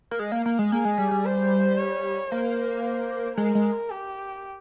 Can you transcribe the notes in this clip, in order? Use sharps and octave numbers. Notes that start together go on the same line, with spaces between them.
A#3
G#3
A#3
A#3
G#3
A#3 G#4
G#3
G3
G3
C5
C#5
A#3 C5
C5
G#3 A#4
G#3
G4